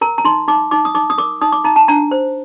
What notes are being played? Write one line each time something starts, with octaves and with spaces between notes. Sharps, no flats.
A#4 A#5
A#5
D#4 C6
D#4 D6
D#4 D6
D#6
D#4 D6
D#6
A#4 D6
D#4 D#6
D6
D#4 A#5
A5
D4 A#5
C5